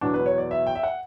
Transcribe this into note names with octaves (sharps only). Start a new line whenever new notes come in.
E2 B2 F#3 D4
B4
C#5
D5
E5
G5
E5
F#5